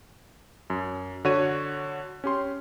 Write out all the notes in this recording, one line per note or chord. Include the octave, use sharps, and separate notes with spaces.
F#2
D3 F#4 C#5 D#7
C#4 G4 C6